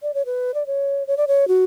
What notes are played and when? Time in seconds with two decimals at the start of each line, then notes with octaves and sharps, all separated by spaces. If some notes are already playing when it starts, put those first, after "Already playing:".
0.03 D5
0.14 C#5
0.26 B4
0.54 D5
0.67 C#5
1.07 C#5
1.17 D5
1.28 C#5
1.48 F#4